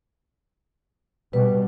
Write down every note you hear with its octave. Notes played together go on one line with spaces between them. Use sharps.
B2 G3 B4